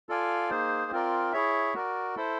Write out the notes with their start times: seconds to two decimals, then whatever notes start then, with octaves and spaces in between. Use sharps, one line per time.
0.09 F4 A4 D5 F5 G#5
0.50 A#3 D#4 G#4 C5
0.92 C4 F4 A#4 D5
1.32 E4 G#4 C#5 E5
1.74 F#4 A#4 D5
2.16 E4 A4 C5